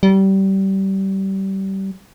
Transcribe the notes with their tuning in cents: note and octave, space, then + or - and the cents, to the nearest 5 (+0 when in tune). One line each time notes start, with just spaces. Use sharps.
G3 -25